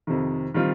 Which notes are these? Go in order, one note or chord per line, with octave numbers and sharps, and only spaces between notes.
F2 C3 D#3
D#3 G3 C4 F4